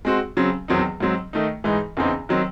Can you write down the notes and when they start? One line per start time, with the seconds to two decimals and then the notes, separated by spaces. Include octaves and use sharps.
0.05 G#3 C4 F#4
0.37 C#3 F#3 C4
0.68 E2 D#3 F#3 C4 D#4
1.00 G#2 F#3 C4
1.33 D#3 A3 D#4
1.64 G#2 E3 G#3 D#4
1.97 E2 C#3 E3 C4 D#4
2.29 D#3 F#3 C4